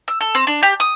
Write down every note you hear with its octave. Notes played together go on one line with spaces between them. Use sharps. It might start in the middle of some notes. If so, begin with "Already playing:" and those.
E6
A4
C4
D4
G4
D#6